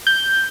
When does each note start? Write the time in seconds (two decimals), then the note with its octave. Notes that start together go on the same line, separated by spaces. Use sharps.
0.07 G6